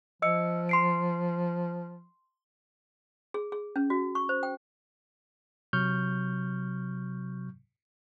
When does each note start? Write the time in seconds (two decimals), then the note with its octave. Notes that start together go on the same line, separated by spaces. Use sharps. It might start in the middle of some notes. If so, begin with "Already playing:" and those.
0.22 F3 D#5 E6 C#7
0.69 C6 C7 D7
3.34 G#4
3.52 G#4
3.76 C#4
3.90 F#4
4.15 C#6
4.29 C5
4.43 G5
5.73 C3 F#3 C#6 F6 G6